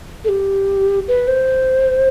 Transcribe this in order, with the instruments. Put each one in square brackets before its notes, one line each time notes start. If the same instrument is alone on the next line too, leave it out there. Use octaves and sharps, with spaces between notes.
[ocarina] A4
G4
B4
C5